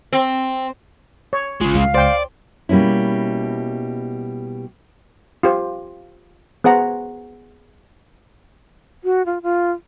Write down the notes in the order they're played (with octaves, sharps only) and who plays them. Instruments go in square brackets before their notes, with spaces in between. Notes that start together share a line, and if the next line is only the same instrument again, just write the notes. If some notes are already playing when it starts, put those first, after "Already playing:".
[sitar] C4
[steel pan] C#5
[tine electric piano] A1 F4 [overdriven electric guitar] C#3 G#3
[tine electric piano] C#2 [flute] F5
[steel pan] C5 G5 [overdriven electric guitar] D5
[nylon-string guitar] B2 G3 A#3 C#4 E4
[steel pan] F4 G4 C5
B3 G#4 C5 F#5 A#5
[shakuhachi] F#4
F4
F4